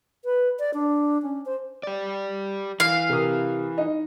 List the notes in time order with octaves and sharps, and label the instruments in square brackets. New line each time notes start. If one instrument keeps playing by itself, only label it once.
[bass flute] B4
D5
D4
C#4
C5
[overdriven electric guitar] G4 D5
[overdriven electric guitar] E3 [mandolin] F5
[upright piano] C3 A#4 D#6
D#4 D#5